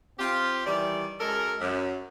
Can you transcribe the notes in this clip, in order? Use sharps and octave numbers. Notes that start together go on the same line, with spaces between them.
C4 F4 G4
D#3 E3 G3 D5
F#2 G#3 A4 A#4
F#2